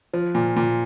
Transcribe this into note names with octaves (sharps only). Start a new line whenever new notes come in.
F3
A#2
A#2